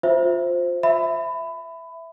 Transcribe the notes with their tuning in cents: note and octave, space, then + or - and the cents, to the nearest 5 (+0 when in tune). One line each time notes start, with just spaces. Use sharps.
F4 +25 C5 +0 E5 +5
E5 +0 B5 +20